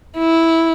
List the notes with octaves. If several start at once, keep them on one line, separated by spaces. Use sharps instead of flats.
E4